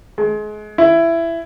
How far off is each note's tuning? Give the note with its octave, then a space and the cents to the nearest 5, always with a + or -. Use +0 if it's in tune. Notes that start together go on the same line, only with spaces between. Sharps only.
G#3 +30
E4 +15